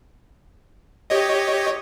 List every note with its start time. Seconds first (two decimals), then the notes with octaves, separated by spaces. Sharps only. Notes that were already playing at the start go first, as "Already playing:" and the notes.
1.10 G4 C#5 D#5